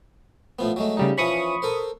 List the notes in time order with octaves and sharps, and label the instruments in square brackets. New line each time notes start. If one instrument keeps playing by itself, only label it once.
[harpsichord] A2 F3 B3
F#3 G#3 A3
[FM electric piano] C#3 G3 D#4
[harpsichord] E3 F3 C#4 [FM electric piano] B5 C#6 D#6
[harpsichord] A4 A#4 C5